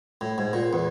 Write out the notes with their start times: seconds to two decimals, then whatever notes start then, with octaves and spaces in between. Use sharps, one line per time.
0.21 A2
0.38 G#2
0.53 A#2
0.73 E2